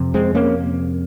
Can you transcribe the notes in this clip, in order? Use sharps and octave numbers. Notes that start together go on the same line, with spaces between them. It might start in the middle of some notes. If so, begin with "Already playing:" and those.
Already playing: F2 C3
G#3 C4
A#3 C#4